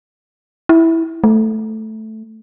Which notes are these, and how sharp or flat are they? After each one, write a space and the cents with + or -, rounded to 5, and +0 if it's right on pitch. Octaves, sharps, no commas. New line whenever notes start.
E4 -5
A3 -5